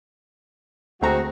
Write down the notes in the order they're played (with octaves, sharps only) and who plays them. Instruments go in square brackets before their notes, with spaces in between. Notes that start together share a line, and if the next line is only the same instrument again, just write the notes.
[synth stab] D2 A3 A#5 [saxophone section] G#3 C4 F#4